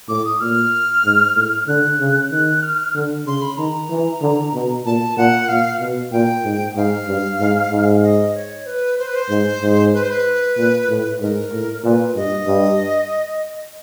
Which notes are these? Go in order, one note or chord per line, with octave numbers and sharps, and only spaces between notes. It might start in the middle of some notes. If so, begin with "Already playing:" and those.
A2 D6
D#6
A#2 F6
G#2
A2
D3 F#6
C#3
D#3 F#6
F6
D3
C#3 C6
B5
D#3 A#5
E3
D3
B2
A#2 A5
A#2 F#5
A#2 F5
B2
A#2 G5
G#2
G#2 F5
G2
G#2
G#2
D#5
C#5
B4
C5
B4
C5
G#2
G#2
B4
C5
B4
A#2
A2
G#2 A#4
A2
A#2 B4
G2 D#5
G2